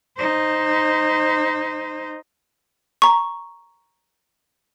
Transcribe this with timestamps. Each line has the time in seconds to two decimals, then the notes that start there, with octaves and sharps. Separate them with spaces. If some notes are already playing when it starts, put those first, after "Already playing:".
0.17 D#4 C5
3.02 A#5 C#6